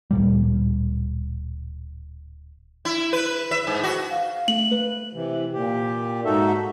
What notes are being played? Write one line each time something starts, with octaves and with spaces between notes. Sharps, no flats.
D1 A#2 G3
E4
B4
E5
G#2
F#4
F5
A3 F#7
B4
C3 E3
A#2 G4
G#2 D#4 F#4 A4 E5